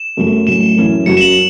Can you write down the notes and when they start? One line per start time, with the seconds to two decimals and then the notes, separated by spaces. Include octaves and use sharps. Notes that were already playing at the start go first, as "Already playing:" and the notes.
Already playing: E7
0.17 F#2 F#3 A3 F#4
0.47 A2 F#3 C#4 E7
0.77 F#2 E3 C#4
1.06 F#2 F#3 C#4 F#4 C#7
1.17 E7
1.21 F#7